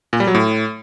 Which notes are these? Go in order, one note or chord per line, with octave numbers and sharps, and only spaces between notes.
A#2
G3
F#3
A2